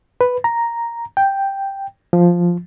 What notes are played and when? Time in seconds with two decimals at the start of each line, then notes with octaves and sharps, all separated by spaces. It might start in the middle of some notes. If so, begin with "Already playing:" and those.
0.21 B4
0.44 A#5
1.17 G5
2.13 F3